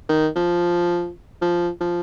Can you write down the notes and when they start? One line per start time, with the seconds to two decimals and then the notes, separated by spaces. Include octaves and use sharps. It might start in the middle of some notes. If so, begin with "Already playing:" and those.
0.09 D#3
0.36 F3
1.42 F3
1.81 F3